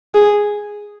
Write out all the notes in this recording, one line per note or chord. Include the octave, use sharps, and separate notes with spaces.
G#4